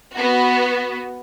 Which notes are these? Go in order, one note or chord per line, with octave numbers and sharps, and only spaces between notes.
B3 F#4